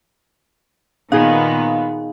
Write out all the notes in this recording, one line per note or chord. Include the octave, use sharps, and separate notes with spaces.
A#2 D#3 B3 D#4 G#4 F5